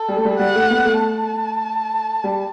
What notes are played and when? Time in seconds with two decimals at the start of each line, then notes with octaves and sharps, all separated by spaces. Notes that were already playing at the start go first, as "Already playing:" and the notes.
Already playing: A4
0.08 G3
0.16 A3
0.25 G3
0.39 G3 F#5
0.55 A3
0.70 B3
0.85 A3
1.01 A5
2.24 G3